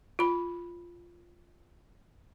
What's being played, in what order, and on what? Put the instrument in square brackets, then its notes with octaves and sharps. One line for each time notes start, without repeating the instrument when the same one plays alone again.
[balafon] F4 B5